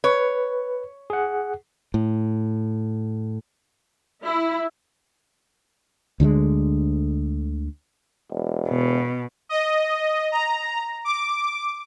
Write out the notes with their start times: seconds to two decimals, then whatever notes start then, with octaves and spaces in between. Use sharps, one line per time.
0.04 B4 C#5
1.10 G#4 F#5
1.94 A2
4.25 E4
6.20 D2 D3 F#3 G#3
8.30 E1
8.68 B2
9.49 D#5
10.32 A#5
11.04 D6